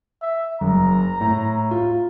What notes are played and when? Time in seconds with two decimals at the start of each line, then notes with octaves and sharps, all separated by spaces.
0.22 E5
0.61 F#1 A#5
1.21 A2
1.71 F4